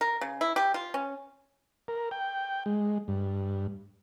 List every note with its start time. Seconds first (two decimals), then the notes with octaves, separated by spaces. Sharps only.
0.01 A#4
0.21 C#3
0.41 E4
0.56 G4
0.74 F4
0.94 C#4
1.88 A#4
2.11 G5
2.66 G#3
3.08 G2